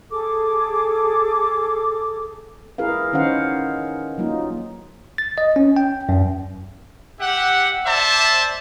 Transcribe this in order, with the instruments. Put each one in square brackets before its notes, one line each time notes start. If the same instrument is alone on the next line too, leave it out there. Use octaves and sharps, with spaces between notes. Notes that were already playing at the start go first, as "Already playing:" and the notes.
[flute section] G#4 A4 D6
[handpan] E4 G#4 A#4 B4 F5
D#3 C#4 D#4 C5 F5 F#5
F#3 A#3 D#4 F4
[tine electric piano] A6
D#5
C#4
G5
F#2
[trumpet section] G4 E5 F#5
C5 D5 E5 A5